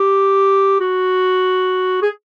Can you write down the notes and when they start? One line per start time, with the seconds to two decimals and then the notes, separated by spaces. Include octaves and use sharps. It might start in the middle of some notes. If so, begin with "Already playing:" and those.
Already playing: G4
0.80 F#4
2.02 G#4